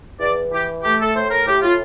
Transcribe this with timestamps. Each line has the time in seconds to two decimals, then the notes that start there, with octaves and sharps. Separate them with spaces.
0.19 E2 D5
0.51 E3 G4
0.83 A3 G4
0.99 A4
1.14 A2 C5
1.31 A#4
1.46 A2 G4
1.62 F4